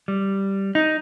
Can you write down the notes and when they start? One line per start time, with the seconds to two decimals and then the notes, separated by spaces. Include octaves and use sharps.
0.08 G3
0.75 D#4